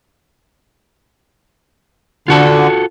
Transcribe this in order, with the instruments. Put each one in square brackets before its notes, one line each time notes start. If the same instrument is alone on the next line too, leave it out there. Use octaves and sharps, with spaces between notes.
[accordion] D3 [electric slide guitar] F4 F#4 A4